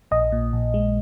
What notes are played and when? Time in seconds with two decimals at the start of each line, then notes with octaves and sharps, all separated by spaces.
0.11 A#1 D#5
0.32 A#2
0.53 A#1
0.74 G#3